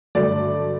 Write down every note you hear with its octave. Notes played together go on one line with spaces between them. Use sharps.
G2 D3 F#3 A3 D5